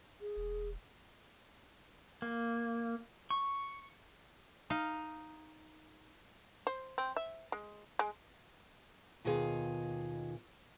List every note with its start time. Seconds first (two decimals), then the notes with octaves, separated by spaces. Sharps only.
0.21 G#4
0.37 E1
2.22 A#3
3.30 C#6
4.70 D#4 F5
6.67 C5
6.98 C4
7.16 E5
7.52 G#3
7.99 G#3
9.24 D#2 B2 D#3 F4 G#4 F5